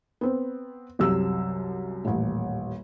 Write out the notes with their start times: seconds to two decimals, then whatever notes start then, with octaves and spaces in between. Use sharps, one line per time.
0.21 B3 C4
0.99 C2 F#2 C3 E6
2.05 D#1 A1